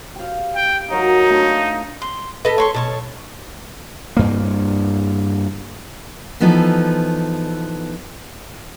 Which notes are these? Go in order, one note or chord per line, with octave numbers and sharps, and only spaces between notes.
G4 F5
G5
F#3 D#4 F#4 A#4
A3 D4 F4
C6
A4 B4 D#5
C#5 C6 C#6
B2 A4 C#5 A5
G2 A#3
E3 F3 B3 D#4 A4